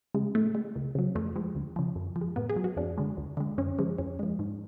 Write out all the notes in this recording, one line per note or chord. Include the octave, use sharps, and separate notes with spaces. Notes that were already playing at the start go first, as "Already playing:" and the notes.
C#3 G#3
A2 A3
G#3
C#2
C#3 F#3
F2 A3
F3 G#3
D2
C#3 F3
F#2
F3
G#3
A2 B3
G#4
F#3
F#4
F2 D4
D3 G#3
D2
D3 G#3
F#2 C#4
C#3 F3 G#3
F2 C#4
F3 G#3
G#2